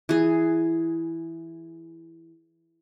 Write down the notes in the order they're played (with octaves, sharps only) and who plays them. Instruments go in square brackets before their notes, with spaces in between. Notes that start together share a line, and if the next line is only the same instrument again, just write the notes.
[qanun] E3 G#4